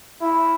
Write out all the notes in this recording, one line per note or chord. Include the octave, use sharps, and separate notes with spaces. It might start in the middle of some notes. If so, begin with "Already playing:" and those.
E4